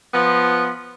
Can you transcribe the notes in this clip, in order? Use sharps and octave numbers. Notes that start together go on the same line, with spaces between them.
F3 B3